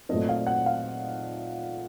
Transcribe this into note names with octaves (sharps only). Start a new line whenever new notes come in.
A#2 F#3 A3 C4 D#5
F5
F#5
F5